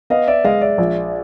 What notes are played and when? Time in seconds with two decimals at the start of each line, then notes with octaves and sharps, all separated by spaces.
0.10 B3 D#5 F5
0.27 D5 E5
0.44 G#3 D#5 F5
0.61 D5 E5
0.78 A#1